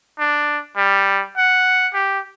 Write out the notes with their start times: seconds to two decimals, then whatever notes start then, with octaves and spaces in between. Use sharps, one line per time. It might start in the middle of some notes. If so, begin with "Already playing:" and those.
0.19 D4
0.77 G3
1.37 F#5
1.94 G4